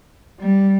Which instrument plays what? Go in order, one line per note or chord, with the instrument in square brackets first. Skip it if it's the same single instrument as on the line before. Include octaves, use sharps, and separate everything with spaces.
[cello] G3